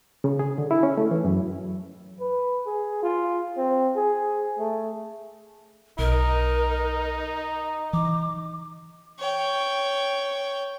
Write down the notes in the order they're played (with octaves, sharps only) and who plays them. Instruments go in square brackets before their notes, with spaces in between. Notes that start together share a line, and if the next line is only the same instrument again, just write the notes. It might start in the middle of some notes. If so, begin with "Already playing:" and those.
[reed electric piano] C#3
G#4
D3
E4
C#4
A3
E3
F#2
[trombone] B4
G#4
F4
C4
G#4
A3
[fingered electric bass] B1 [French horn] D#4 [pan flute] A#4
[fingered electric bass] E3 [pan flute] D6
[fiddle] C#5 G5